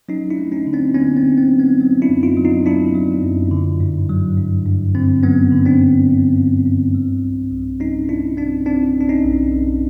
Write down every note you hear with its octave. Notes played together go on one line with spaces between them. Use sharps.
F#3 C#4 D#4
D4 E4
A3
C#4 D#4
D3
C4 D4
D3 B3 C#4
C4
D3
C4
F#3
B3
F#3 C4
D4 E4
F#2
D#4 F4
F#3
D#4 F4
F#3 D4 E4
F#3
F#2
D3
G2
F#3
G2
G2
D3 C4
F#3 B3 C#4
D3
C4 D4
G2
G2
G2
G2
G3
B1
B1
G3 C#4 D#4
B2 D4 E4
B1 C4 D4
B1 C4 D4
B1
D4
C#4 D#4
B1
B1